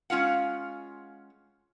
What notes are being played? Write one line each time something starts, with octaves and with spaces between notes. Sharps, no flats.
G#3 C#4 F4 F5 F#5